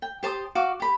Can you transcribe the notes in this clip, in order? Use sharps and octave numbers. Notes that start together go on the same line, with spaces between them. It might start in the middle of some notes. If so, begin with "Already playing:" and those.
G5
G4 C5 A5 D#6
F#4 F5 D6
G4 B5